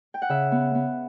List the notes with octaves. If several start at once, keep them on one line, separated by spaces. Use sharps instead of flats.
G5
F#5
C#3 E5
B3
B3